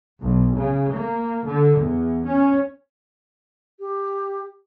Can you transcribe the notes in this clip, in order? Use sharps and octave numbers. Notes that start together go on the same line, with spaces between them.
B1
C#3
A#3
D3
E2
C#4
G4